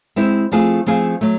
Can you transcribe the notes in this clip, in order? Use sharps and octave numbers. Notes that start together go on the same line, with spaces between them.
G#3 C4 E4
F3 A3 C4 F4 G#4
F3 A3 C4 F4 G#4
F#3 A3